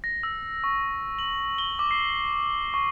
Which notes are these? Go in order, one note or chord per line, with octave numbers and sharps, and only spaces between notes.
A#6
E6
C#6
F#7
G7
D6
C7
C#6